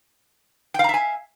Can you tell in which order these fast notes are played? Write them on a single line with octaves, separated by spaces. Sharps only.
G5 F5 A#5 E5 G#5